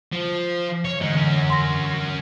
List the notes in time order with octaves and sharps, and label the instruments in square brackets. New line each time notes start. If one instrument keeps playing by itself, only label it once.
[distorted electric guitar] F3
C#5
[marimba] D3 E3 [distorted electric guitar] G#3 D#4
[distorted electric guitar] C#4 A#4
[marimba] C6 A#6